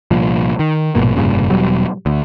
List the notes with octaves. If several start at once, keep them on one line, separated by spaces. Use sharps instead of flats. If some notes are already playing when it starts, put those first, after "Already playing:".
C2 A#2 F3
D#3
A#1 G#2 B2 A#3
F1 G2 A#2 C#3
E1 B2 F#3 G3
D2